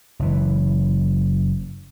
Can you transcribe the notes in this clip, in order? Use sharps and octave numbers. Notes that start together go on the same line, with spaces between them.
F#1 E3